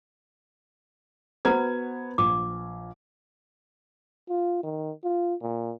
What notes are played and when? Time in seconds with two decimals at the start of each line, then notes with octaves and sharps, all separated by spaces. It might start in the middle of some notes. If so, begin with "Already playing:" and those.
1.45 B3 F#4 B4 C5 A#5 G#6
2.18 A#1 D6
4.29 F4
4.63 D#3
5.04 F4
5.42 A#2